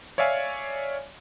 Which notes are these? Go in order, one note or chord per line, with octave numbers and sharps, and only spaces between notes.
C#5 D5 E5 F5 G#5